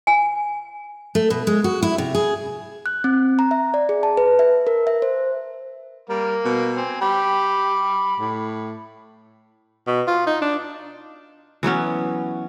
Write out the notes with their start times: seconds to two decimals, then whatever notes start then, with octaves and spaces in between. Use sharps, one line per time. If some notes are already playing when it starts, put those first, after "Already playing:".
0.07 G#5
1.15 A3
1.30 B2
1.47 G#3
1.64 F#4
1.83 E4
1.98 C3
2.15 G#4
2.86 F#6
3.04 C4
3.39 A#5
3.51 E5
3.74 D5
3.89 G#4
4.03 A5
4.17 B4
4.39 E5
4.67 A#4
4.87 E5
5.02 C5
6.09 G3 A#3 A#4
6.45 B2
6.77 C4 G#5
7.02 G4 B5 D6
8.20 A2
9.87 B2
10.07 F4
10.27 D#4
10.42 D4
11.63 E3 F#3 B3 C#4